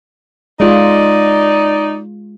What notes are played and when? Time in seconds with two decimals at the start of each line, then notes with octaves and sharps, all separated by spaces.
0.60 G#3 D#4 F4 D5